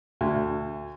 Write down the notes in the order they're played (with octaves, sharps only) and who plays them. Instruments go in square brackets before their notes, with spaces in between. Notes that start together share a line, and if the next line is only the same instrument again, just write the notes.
[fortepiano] D2